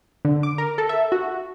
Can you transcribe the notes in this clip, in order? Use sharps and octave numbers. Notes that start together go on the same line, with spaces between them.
D3
D6
A#4
A4
E5
F#4